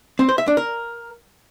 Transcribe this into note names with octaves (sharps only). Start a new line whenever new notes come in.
C4
C5
E5
D4
A#4